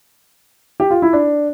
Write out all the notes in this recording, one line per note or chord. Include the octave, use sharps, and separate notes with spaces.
G4
F4
E4
D4